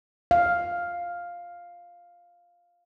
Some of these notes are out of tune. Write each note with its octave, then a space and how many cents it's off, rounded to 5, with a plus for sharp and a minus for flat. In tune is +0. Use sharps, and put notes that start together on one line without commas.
F5 +5